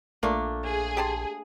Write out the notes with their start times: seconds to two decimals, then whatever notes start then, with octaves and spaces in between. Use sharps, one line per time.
0.23 A#1 A3 A#3 D4 F4
0.67 G#4
0.97 G4 A5 C6